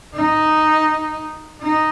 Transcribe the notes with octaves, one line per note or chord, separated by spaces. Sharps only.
D#4
D#4